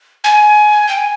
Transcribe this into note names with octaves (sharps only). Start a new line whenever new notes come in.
G#5
G5
G#5